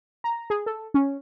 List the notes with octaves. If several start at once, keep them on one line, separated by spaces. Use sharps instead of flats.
A#5
G#4
A4
C#4